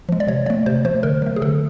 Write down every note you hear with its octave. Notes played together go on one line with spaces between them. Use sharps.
F3 G#3
D5
C3 C#5
F3 A3 D5
C3 C5
F3 A3 C5
D3 A#4
F#3 A3
G#4
D3 A4